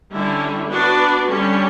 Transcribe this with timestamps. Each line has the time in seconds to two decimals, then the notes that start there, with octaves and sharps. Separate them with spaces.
0.11 D3 G3 C#4 E4
0.69 B3 D4 F#4 B4 D5
1.28 D3 G3 C#4 G4